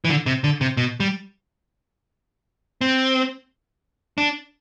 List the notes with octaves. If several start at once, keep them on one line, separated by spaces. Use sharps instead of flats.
E3
D3
C3
D3
C3
B2
G3
C4
D4